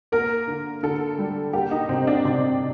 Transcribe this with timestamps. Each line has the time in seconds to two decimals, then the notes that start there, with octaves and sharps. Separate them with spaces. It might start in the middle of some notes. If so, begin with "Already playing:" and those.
0.12 A#3 A#4
0.47 D3
0.83 D3 A4
1.19 G3
1.53 A#3 G4
1.71 D#4
1.89 C3 C4
2.07 D4
2.25 C3 C4